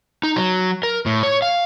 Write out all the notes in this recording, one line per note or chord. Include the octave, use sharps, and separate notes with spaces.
D#4
F#3
A#4
A2
C#5
F5